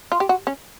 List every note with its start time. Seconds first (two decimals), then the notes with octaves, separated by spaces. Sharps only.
0.12 F4
0.20 G4
0.29 F#4
0.47 C#4